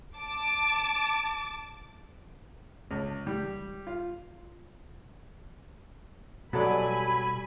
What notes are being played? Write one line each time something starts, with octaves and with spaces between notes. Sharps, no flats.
A5 D6
C#2
G3
F4
B2 F#3 G3 A4 D5 G#5 B5